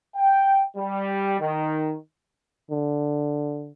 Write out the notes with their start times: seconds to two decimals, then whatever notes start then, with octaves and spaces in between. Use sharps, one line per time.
0.16 G5
0.76 G3
1.40 D#3
2.70 D3